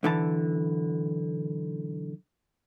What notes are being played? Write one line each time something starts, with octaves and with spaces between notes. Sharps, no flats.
B1 D3 E3 A5